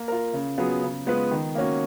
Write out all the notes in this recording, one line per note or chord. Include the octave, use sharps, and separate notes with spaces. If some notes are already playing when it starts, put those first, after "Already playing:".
Already playing: A#3
F4 A#4
C#3
F#3 B3 F4 G#4
C#3
G#3 B3 F4 B4
D#3
A#3 C#4 F#4